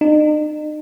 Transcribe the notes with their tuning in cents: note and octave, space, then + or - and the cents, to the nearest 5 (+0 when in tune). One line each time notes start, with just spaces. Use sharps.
D#4 -40